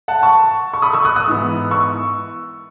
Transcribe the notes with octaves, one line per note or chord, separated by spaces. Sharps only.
F#5 A5
A5 C#6
C#6
B5 D#6
C#6 E6
D#6 F#6
D#6 F#6
G#2 E3 B3
C#6 E6